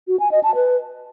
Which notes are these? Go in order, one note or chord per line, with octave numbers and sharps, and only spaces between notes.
F#4
G#5
D#5
A5
B4